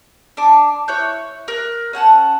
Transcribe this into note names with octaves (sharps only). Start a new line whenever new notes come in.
D4 D6
E4 C#5 F#6 G6
A#4 F#6
C#4 F#5 G#5 A5